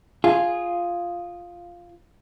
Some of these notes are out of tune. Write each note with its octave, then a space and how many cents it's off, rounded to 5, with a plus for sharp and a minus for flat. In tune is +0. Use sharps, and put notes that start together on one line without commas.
F4 +0 G#4 +0